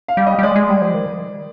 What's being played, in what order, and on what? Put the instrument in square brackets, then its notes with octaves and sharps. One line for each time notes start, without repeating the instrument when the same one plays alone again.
[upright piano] F5
[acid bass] G3
[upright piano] D#5
[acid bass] G3
[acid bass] G#3 [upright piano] D5
[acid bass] G#3
G3
F3
D#3